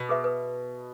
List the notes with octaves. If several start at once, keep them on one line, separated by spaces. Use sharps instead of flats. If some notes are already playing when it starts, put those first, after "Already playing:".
Already playing: B2
G#4 B4 E5
B4